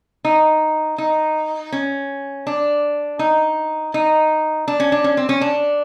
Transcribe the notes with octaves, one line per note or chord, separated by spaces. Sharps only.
D#4
D#4
C#4
D4
D#4
D#4
D4
C#4
D4
C#4
C4
C#4
D4